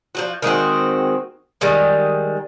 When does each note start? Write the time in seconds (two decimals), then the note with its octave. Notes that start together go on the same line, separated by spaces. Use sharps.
0.15 F3 F#3 F#4
0.42 D#3 G#3 C4 F#4
1.61 D#3 G3 G#3